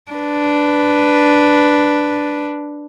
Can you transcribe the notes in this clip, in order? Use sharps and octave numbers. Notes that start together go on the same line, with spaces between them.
D4 B4